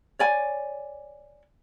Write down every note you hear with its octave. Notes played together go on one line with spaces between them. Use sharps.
C#5 D5 G#5